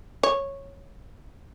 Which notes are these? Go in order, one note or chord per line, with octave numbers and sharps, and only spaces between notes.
C#5